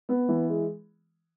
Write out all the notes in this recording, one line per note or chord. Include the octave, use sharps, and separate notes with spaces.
B3
E3
G#3